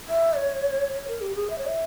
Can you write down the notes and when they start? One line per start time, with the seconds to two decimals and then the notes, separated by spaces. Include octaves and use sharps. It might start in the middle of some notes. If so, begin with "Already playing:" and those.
0.09 E5
0.36 C#5
0.94 C#5
1.08 A#4
1.21 G4
1.35 G#4
1.50 E5
1.58 C#5
1.67 E5